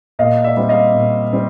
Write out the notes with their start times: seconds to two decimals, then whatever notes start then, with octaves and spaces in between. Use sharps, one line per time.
0.19 A#2 D#5 F5
0.44 D5 E5
0.57 G3 C4
0.69 D#5 F5
0.95 A#2
1.33 G3 C4